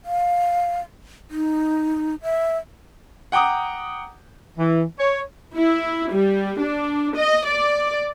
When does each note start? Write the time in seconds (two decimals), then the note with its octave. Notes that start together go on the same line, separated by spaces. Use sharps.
0.05 F5
1.31 D#4
2.23 E5
3.32 F#5 G5 A#5 D6 D#6
4.57 E3
4.97 C#5
5.56 E4
6.11 G3
6.60 D4
7.16 D#5
7.47 D5